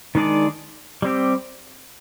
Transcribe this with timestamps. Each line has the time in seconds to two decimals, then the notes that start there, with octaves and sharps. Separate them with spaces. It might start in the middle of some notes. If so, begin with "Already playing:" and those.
0.15 D#3 G#3 D4 G#4 D5
1.02 G3 C4 G4